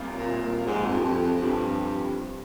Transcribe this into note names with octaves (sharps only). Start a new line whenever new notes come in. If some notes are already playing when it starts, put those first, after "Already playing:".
Already playing: C3 G3 A#3 F4
A#2
A#2
G#2 F3 C4 G4
F2
G2
F2
F2
G2 F3 C4 G4